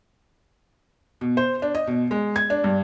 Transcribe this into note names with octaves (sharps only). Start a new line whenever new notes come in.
B2
C5
D4
D#5
B2
G#3
G#6
D4
G2